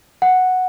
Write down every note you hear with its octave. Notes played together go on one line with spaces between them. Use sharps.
F#5